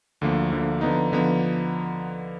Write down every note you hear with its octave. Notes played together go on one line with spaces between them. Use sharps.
D2 D3 F3 A#3
D2 D3 F3 A#3
D3 F3 B3 D#4
D3 F3 B3 D#4